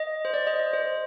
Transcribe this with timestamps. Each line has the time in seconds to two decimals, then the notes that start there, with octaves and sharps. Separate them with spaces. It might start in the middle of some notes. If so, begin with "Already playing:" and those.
Already playing: D#5
0.25 C5
0.34 D5
0.47 D#5
0.59 D#5
0.73 C5